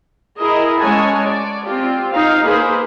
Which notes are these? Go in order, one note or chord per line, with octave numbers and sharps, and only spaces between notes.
E4 G#4 A#4 D#5
G#3 C#4 C#5 F#5 G#5 A5
D5
C4 F4 G4
D#4 F5
A#3 G#4 B4 C5